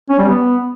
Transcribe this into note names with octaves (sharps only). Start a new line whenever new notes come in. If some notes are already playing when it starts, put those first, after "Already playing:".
C#4
G3
B3